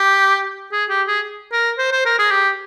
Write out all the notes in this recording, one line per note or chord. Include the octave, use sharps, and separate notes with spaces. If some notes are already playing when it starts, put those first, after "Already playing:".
Already playing: G4
G#4
G4
G#4
A#4
C5
C5
A#4
G#4
G4